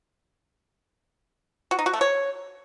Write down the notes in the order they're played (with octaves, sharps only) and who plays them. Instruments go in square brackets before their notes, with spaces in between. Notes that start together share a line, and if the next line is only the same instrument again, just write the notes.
[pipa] F#4
D#4
F#4
A3
C#5